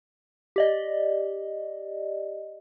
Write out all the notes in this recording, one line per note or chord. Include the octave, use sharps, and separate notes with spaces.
G4 D5 D#5